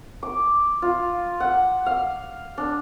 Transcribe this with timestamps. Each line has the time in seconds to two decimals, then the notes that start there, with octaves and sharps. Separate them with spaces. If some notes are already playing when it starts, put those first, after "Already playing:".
0.23 D6
0.82 F4
1.40 F#5
1.86 F5
2.58 D4